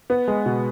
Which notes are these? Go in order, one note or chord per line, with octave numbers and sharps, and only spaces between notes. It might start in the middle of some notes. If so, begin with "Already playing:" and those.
B3
G#3
B2